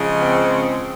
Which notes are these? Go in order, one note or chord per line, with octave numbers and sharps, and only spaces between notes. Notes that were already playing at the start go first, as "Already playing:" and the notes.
Already playing: C#3 F3 G#3
C4